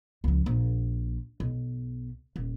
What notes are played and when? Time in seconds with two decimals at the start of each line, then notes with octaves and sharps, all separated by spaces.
0.24 C#2 F3
0.46 A#1
1.40 B1
2.36 D#1